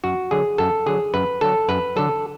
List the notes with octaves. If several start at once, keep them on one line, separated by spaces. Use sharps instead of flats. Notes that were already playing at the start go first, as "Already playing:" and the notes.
F#2 F#4
D3 F#3 G#4
F#2 A4
D3 F#3 G#4
F#2 B4
D3 F#3 A4
F#2 B4
D3 F#3 A4